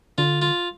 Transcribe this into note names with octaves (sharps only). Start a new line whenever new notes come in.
D3 F4
F4